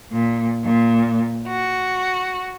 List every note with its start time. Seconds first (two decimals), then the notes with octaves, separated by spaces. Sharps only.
0.12 A#2
0.64 A#2
1.47 F#4